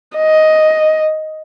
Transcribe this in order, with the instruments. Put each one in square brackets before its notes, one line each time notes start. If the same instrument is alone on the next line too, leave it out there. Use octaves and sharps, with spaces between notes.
[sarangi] D#5